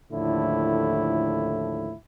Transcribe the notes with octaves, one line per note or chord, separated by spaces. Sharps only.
D#2 A2 D3 F3 E4